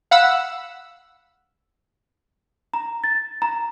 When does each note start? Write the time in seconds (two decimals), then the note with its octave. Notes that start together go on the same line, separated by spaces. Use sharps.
0.11 F5 F#5 B5 E6
2.74 A#5
3.04 A6
3.42 A#5